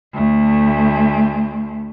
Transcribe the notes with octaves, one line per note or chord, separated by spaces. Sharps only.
D2 A3